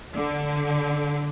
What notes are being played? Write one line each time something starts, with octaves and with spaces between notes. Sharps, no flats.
D3